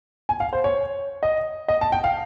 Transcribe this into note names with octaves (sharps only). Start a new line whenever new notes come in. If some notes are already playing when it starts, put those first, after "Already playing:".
G#5
F5
C5
C#5
D#5
D#5
A5
G5
F5